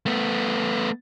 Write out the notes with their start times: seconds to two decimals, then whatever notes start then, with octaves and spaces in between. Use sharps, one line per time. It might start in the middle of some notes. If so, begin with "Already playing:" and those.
0.06 A3 B3